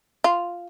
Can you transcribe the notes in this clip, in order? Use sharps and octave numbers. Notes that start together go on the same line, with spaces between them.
F4